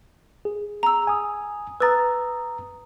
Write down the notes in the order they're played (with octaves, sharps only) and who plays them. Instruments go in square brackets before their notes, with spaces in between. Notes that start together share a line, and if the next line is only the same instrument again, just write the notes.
[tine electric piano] G#4
[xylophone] A#5 E6
[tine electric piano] G#5 D#6
[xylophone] B4 A6 [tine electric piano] A#5 D#6 E6